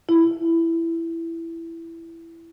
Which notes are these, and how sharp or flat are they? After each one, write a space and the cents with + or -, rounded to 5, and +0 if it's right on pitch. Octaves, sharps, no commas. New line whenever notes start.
E4 +10